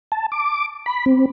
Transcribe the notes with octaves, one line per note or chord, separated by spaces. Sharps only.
A5
D6
B5
C4